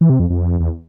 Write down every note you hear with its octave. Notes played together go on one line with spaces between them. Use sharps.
E3
C3
F2
F2
E2